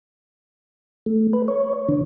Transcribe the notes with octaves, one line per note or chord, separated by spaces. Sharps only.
A3
B4
C#5
D3